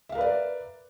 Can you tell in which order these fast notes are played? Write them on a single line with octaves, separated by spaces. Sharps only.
E5 F5 A#4 B4 D5